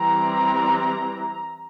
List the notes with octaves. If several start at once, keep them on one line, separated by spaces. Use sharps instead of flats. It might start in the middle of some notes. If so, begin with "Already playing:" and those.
Already playing: E3 G3 C4 A#5